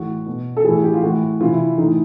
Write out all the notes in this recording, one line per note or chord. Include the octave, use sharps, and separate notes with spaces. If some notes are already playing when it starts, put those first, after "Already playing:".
Already playing: A2 E3 F#4
B2
A4
A2 E3 G#4
G4
F4
A2 E3 F#4
C3 E3 F4
E4
A2 E3 D#4